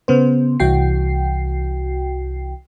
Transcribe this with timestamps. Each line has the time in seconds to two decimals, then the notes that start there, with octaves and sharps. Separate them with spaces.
0.08 C#3 B3 C5
0.60 C2 E3 F#4 G5 C7